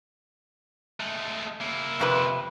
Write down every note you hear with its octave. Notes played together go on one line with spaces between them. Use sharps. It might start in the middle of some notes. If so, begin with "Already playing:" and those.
G#3 A3
A#3 E4
F2 C3 B4